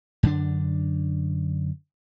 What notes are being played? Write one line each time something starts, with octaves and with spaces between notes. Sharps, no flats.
F#2 D3 D4